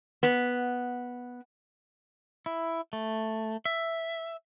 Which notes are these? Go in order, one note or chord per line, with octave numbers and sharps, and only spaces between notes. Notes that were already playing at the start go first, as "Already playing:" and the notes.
B3
E4
A3
E5